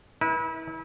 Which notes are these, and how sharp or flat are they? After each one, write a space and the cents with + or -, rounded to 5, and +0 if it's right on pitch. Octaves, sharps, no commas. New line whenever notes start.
E4 -35 B4 -35